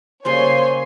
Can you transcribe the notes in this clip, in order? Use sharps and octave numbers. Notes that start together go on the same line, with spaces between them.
C#3 G3 A#3 C5 C#5 G#5 C6